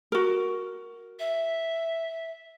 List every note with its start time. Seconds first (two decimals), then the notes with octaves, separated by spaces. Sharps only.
0.12 F#4 A#4
1.19 E5